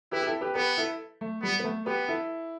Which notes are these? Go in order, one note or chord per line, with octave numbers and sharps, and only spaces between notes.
E4 G4 B4
G4
E4 A4
G4 B4
B3 G4 B4
E4 A4
A3
G3 B3
B3
A3
B3 G4 B4
E4 A4